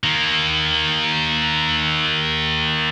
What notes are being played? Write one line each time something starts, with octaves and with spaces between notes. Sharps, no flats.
D#3 A#3